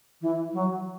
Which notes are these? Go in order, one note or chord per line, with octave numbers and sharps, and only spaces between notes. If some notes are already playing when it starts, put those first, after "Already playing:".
E3
F#3